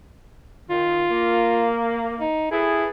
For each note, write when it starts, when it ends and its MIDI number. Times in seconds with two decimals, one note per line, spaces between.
0.70 1.03 51
0.70 1.67 65
1.11 2.23 58
2.20 2.52 63
2.52 2.85 64
2.52 2.90 68
2.52 2.90 69
2.52 2.90 71